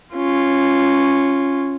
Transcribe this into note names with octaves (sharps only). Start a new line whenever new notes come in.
C#4 F4